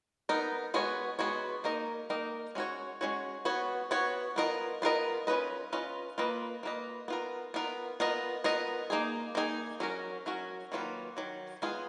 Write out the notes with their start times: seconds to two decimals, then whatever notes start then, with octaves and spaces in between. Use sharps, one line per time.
0.29 B3 D#4 A#4
0.74 G#3 B3 F#4 C#5
1.19 G#3 B3 F#4 C#5
1.64 A#3 D#4 A#4 D#5
2.10 A#3 D#4 A#4 D#5
2.55 G#3 C#4 F#4 C#5
3.01 G#3 C#4 F#4 C#5
3.45 B3 F#4 C#5
3.91 B3 F#4 C#5
4.36 B3 F4 A#4 D#5
4.82 B3 F4 A#4 D#5
5.27 C#4 F4 B4 D#5
5.73 C#4 F4 B4 D#5
6.18 A#3 F4 B4 D#5
6.63 A#3 F4 B4 D#5
7.08 B3 F4 A#4
7.54 B3 F4 A#4
8.00 B3 F4 A#4 D#5
8.44 B3 F4 A#4 D#5
8.90 A#3 D#4 G#4
9.35 A#3 D#4 G#4
9.80 F#3 C#4 F#4 A#4
10.26 F#3 C#4 F#4 A#4
10.72 D#3 F#3 A#3 F4 B4
11.17 D#3 F#3
11.62 G#3 B3 F4 G#4